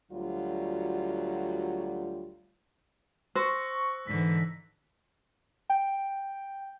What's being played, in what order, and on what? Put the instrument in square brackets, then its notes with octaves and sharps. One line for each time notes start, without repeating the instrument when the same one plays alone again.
[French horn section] D2 F#3 G3 F4
[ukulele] C5 [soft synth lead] C#6 [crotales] E6 F#6 A#6
[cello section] G#2 D3 E3 [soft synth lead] B6
[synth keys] G5